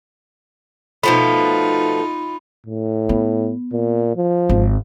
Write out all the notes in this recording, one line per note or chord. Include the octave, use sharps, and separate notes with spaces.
B2 F3 A3 D#4 F4 B5
A2
B3
A#2
F3
G#1